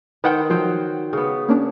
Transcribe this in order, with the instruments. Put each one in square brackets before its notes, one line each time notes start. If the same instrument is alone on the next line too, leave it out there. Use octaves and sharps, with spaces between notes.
[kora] D#3 C5 [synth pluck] B4 F#5 G5
[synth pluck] F3 [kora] F#3 C5 G5
[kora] C#3 B3
[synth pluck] A#3 C#4 D4